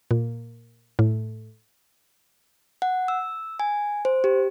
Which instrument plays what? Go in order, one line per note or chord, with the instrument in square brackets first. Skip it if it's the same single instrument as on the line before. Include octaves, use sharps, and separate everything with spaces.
[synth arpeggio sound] A#2
A2
[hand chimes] F#5
E6
G#5
C5
G4